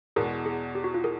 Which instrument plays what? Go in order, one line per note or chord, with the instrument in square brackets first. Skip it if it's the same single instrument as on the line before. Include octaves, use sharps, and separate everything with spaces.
[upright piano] E2 B2 G#3 [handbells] G#4 A#4
[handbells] G#4
G4
F#4
F4
G#4 A#4